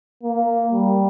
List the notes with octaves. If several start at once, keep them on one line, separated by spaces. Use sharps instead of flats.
A#3
G3